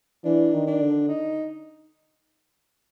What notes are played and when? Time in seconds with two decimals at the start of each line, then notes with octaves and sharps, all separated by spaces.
0.25 E3 D4
0.53 D#3
0.67 D4
0.81 D3
1.09 D#4